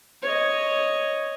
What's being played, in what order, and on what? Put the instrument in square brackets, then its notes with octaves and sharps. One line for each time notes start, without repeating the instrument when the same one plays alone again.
[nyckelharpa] C#5 D#5